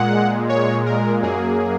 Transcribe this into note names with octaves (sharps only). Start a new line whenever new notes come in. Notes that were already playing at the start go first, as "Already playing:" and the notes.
Already playing: A#2 G#3 F#5
C#5
A#4
F#2 F#3 A#3 G#4